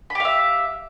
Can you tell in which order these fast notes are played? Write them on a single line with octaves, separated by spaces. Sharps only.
B5 G4 F5 E5